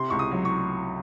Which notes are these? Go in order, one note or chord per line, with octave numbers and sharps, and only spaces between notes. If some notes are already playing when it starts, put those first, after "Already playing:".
Already playing: C3 C6
C#2 C#6
D#6
F#3
C#6